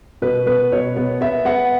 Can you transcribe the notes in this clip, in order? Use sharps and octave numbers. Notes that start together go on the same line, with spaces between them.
B2 B4
B3 B4
B2 C#5
B3
B3 E5
B3 F#5